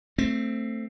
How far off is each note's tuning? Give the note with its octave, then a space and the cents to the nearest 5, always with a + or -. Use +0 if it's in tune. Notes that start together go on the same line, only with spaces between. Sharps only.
A3 +15 C4 +0